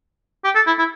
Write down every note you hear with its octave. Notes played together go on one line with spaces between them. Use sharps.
G4
A4
E4
E4